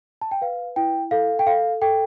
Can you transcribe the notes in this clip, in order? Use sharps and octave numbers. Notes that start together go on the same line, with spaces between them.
A5
G5
B4 F5
E4 G5
A4 F5
G5
A4 F5
A4 G5